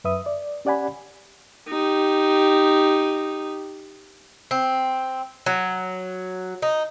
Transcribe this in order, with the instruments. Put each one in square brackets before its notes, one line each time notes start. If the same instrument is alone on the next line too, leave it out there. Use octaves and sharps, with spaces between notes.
[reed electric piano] F#2 B4 E5 D#6
D5
C#4 G4 D5 F#5 G#5 B5
[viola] D#4 G4
[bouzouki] C4
F#3
D#4